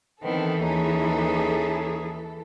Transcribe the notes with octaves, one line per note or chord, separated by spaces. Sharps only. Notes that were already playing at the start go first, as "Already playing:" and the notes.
D#3 E3 B3 C4 A4
D#2 C#4 D#4 G#4